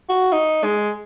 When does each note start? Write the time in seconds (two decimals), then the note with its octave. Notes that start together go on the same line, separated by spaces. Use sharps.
0.09 F#4
0.32 D#4
0.64 G#3